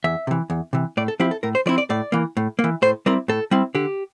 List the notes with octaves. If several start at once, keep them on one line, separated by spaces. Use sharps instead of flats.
E2 E5
C3 E3
E2
C3 E3
A2 D5
A4
F3 C4 E4 G4
A4
A2 A#4
C5
F3 C4 E4 D5
D5
A2 D5
E3 A#3
A2
A#3
E3
A2 C5
G3 C4 E4 A#4
A2 A4
G3 C4 E4
D3 G4